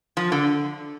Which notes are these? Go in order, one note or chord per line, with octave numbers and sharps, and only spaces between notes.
F3
D3